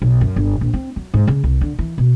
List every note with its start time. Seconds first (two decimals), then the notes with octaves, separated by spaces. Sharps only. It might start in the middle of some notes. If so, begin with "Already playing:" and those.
0.02 B1
0.21 F#2
0.36 G1
0.61 A#1
0.74 C4
0.96 F#3
1.14 G#2
1.27 C#3
1.44 C2
1.61 D3
1.79 E3
1.98 B2